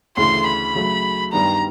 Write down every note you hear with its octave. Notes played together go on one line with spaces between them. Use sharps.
D2 C#3 E3 A3 C6
B5
C#3 F#3 A3
G2 D#3 G3 B3 D4 A#5